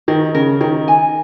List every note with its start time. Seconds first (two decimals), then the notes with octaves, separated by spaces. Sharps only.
0.08 D#3 A#4
0.35 C#3 A#4
0.61 D#3 A#4
0.88 G#5